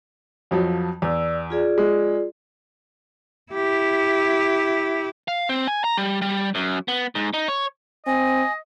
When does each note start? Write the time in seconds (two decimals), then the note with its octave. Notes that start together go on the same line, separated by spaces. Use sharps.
0.51 F2 F3 F#3
1.02 E2 D5 E6
1.50 F4 G#4 D5
1.78 G#3
3.53 E4 G4
5.28 F5
5.49 C4
5.68 G#5
5.84 A#5
5.98 G3
6.22 G3
6.55 F#2
6.88 B3
7.15 G#2
7.34 D#4
7.48 C#5
8.07 C4 D#5 G#5